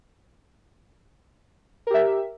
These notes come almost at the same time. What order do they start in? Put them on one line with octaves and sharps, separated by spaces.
A#4 G4 E5